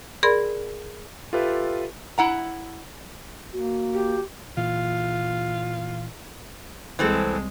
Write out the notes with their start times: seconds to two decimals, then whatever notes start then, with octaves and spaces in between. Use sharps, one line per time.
0.23 G#4 A#4 D5 B5 C6
1.33 F4 G4 A4 B4 E5
2.18 E4 F#5 A#5
3.53 A#3 F#4
3.94 G4
4.57 A#2 E3 F4
6.99 C2 E3 G#3 C4 A4